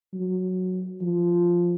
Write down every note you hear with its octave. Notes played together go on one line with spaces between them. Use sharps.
F#3
F3